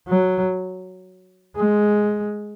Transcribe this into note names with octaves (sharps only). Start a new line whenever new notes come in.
F#3
G#3